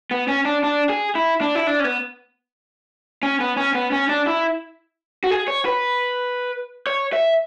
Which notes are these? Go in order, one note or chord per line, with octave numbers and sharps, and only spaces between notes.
B3
C#4
D4
D4
G#4
E4
D4
E4
D4
C#4
B3
C#4
B3
C#4
B3
C#4
D4
E4
F#4
G#4
C#5
B4
C#5
E5